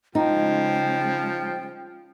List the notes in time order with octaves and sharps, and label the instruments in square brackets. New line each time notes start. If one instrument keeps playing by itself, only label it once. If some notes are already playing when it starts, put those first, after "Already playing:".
[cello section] C#3 G#3 [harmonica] F3 [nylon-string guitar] D#4 [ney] G5